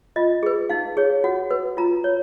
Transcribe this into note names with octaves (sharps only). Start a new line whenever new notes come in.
F4 D#5
G#4 B4
D#4 F5
G#4 C#5
F#4 F#5
B4
F4 A#5
C#5